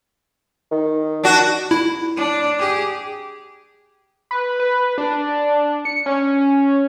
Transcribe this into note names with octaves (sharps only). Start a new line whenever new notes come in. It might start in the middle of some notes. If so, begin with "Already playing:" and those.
D#3
D4 F#4
E4
D4
G4 G#4
B4
B4
D4
C#7
C#4